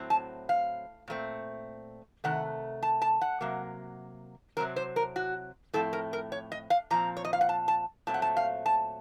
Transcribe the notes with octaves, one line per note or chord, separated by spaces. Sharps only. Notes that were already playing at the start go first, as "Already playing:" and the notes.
Already playing: A2 F#3 C4
A5
F5
A#2 A3 C4
C3 D#3 A3 F#5
A5
A5
F#5
C3 F#3 A#3
C3 F#3 C4 A#4
C5
A#4
F#4
A2 F3 A3 C4 A4
A#4
A#4
C#5
D#5
F5
A#2 F3 C4 A#5
C#5
D#5
F5
F#5
A5
A5
A#2 F#3 A3 C4 A5
F#5
A5
F5
A5